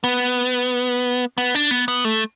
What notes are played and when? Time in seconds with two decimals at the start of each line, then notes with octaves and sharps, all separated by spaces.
0.04 B3
1.38 B3
1.55 D4
1.71 B3
1.88 B3
2.05 A3